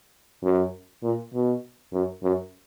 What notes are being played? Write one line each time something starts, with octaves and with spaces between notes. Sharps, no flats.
F#2
A#2
B2
F#2
F#2